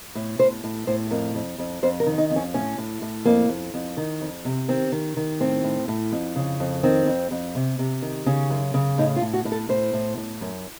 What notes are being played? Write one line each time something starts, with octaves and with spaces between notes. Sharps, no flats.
A2
A2 C5
A2
A2 C5
F2 A#4
F2
F2
F2 C5
A#4
D#3
D#4
F2
C#4
A2 C#4
A2
A2
F2 A#3
F2
F2
D#3
F2
C3
D#3 C4
D#3
D#3
A2 C4
A2
A2
F2
C#3
F2
D#3 C4
F2
F2
C3
C3
D#3
C#3 C#4
F#2
C#3
A2 D#4
F4
A2
F#4
A2
A4
A2 C5
A2
A2
F#2